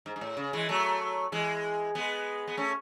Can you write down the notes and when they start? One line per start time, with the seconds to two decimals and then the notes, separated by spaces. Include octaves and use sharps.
0.06 G#2
0.16 G#2
0.21 A2
0.37 C#3
0.53 E3 G#3
0.69 F#3 A3
1.32 E3 G#3
1.95 G#3 B3
2.48 B3
2.57 A3 C#4